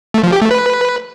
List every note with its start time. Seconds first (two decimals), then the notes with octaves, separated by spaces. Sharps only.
0.14 A3
0.23 F3
0.33 G4
0.42 A3
0.51 B4